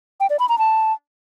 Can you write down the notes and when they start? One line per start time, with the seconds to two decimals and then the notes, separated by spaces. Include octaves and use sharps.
0.20 G5
0.30 D5
0.39 B5
0.49 A#5
0.59 A5